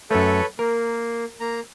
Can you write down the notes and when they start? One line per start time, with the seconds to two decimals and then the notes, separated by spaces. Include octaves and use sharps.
0.11 F#2 A3 A4 B4 C#5
0.59 A#3 A#4
1.40 A#3 A#5